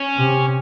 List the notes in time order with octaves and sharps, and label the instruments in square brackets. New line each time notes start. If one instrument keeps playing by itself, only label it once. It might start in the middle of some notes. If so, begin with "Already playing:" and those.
Already playing: [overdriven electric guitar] C#4
[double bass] C3